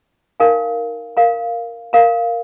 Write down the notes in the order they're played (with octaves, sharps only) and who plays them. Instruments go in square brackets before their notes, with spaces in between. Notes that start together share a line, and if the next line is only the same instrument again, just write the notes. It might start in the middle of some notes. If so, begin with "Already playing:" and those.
[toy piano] D#4 A#4 F5 G#5
A#4 F5 A#5
A#4 F5 A#5